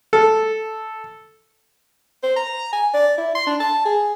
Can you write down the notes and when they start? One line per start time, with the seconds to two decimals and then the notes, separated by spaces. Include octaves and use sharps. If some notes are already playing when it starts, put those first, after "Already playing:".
0.13 A4
2.23 C5
2.36 A#5
2.73 G#5
2.94 D5
3.18 E4
3.35 C6
3.46 D4
3.60 A5
3.85 G#4